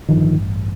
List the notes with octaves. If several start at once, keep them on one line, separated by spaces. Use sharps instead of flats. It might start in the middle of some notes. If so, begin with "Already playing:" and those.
A1 G2 D3 D#3 F3